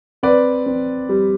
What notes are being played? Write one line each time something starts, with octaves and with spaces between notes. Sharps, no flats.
C4 B4 D5
C4
G3